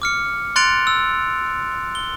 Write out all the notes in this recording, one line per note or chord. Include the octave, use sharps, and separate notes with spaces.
D6 F6 C#7
C6 F#6 A6 C#7 D7 F7
E6
G7